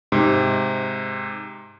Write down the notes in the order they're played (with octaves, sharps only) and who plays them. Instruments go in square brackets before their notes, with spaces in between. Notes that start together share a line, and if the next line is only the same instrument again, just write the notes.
[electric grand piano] G#2 C3